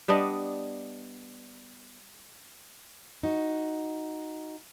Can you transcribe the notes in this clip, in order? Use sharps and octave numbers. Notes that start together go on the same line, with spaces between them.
G3 B3 D4 D#5
D#4 F#4